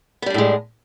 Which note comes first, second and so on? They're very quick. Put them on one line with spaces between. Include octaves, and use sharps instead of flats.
B3 G3 D4 A2 G#3